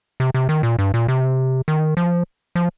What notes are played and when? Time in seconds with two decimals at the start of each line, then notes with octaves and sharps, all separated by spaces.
0.20 C3
0.34 C3
0.49 D#3
0.63 A#2
0.79 G2
0.94 A#2
1.08 C3
1.68 D#3
1.97 F3
2.55 F3